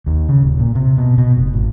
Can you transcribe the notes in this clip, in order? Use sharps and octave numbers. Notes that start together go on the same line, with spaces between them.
D#2
C#3
D#1
A#2
C3
B2
B2
F1
G#1